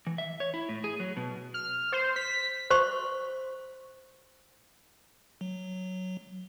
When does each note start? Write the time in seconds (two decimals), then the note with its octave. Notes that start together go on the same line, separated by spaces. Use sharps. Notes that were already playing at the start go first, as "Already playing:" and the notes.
0.07 E3
0.18 E5
0.40 C#5
0.54 E4
0.69 A2
0.84 G#4
1.00 F#3
1.17 B2
1.54 F6
1.92 C5
2.16 B6
2.70 C5 C6 C#6
5.41 F#3